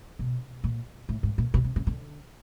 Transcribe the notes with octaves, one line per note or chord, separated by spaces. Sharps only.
B2
A#2
A2
G#2
A#2
B2
C3
C#3
D3